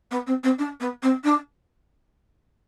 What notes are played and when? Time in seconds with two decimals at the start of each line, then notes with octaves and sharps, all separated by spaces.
0.11 B3
0.27 C4
0.43 C4
0.59 D4
0.80 B3
1.03 C4
1.24 D4